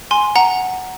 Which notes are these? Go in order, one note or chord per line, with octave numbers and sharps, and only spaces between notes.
G#5 C6
F#5 A#5